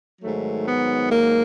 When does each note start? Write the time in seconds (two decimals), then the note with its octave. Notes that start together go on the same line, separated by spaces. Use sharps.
0.21 G#2 D#3 F#3 A3
0.66 B3
1.11 A#3